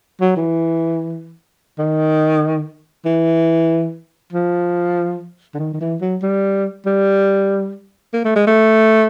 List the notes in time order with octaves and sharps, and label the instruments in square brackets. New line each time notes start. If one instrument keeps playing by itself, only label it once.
[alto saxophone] F#3
E3
D#3
E3
F3
D3
D#3
D#3
E3
F#3
G3
G3
A#3
A3
G#3
A3